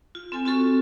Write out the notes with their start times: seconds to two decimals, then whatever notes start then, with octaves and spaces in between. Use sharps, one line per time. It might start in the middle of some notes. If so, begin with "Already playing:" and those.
0.15 F4
0.32 C4 A4 G#5
0.45 C4 F4 F#4 A4 C#6